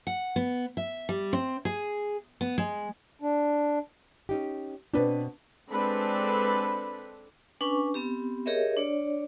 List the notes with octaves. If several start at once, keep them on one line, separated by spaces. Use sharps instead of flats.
F#5
B3
E5
G3
C4
G#4
B3
G#3
D4
C#4 D#4 G4
B2 C4 D4 B4
G#3 C4 D4 A4 B4 B5
C#4 D4 B4 G#5 C#6 D6
B3 C4 G4
G4 G#4 A#4 C#5 D#5 E5
D4 C#5 D5